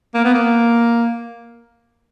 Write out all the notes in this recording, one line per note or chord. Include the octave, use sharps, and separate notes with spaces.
A#3
B3
A#3